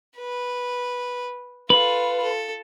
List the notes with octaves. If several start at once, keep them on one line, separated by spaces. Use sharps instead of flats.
B4
F4 A4 B4
A4